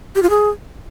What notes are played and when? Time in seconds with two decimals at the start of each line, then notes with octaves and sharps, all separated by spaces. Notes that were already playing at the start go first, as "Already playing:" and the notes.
0.15 G4
0.23 F4
0.30 G#4